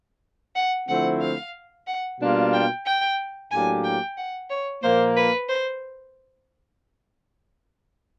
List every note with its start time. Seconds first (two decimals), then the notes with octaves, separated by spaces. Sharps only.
0.56 F#5
0.88 D3 F3 A3 C4 E4 F#5
1.21 F5
1.87 F#5
2.20 B2 G3 A#3 D4 F4
2.53 G5
2.86 G5
3.51 A2 F#3 A#3 D4 G4 G#5
3.84 G5
4.18 F#5
4.50 C#5
4.83 A#2 F3 A#3 C5
5.17 B4
5.49 C5